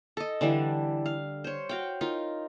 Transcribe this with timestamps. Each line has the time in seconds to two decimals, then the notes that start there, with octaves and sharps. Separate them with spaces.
0.17 A4 D#5
0.41 D3 E3 G3 D4
1.06 F5
1.44 C5 C#5
1.69 F#4 F5 G5
2.01 D#4 F4 A#4